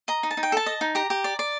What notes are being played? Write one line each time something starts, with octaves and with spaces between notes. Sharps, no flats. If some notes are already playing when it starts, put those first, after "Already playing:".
D#5 A#5
D#4
A5
D#4
G5
A4 A5
D#5
D#4
G4 A#5
G4
D5
D5